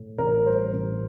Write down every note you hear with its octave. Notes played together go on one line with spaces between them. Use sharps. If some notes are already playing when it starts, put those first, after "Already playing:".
Already playing: A2
A1 A#4
G3 C5
A1